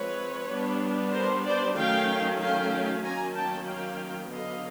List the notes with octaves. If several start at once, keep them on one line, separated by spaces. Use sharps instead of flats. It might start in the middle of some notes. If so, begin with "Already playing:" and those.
Already playing: F3 G#3 C4 B4 C#5
G3 B3 D4
A#4 C5
C5 D5
D#3 F#3 A3 C#4 F5 G5
F5 G5
D#3 F#3 A#3 C#4 G#5 A#5
G5 A5
F5 G5
D3 F#3 B3 D#5 F5